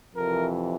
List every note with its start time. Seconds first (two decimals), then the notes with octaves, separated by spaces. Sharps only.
0.15 F2 C3 E3 A#4